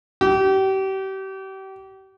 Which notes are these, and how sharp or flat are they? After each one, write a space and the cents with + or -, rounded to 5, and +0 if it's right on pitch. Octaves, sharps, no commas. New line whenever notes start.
G4 -35